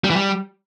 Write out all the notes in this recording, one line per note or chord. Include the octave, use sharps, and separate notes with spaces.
G3
E3
G3